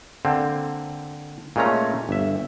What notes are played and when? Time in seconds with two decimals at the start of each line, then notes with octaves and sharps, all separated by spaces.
0.25 D3 A#3 C4
1.56 A#2 G#3 A3 C#4 A#5
2.09 G1 E5